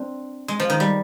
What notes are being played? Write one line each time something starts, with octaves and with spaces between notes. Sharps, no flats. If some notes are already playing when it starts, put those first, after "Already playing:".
Already playing: C4 D4
G#3
F3
D#3
G3